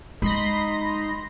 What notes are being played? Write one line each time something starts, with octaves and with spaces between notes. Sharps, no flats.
G#3 D#4 D#5 B5 C6 A#6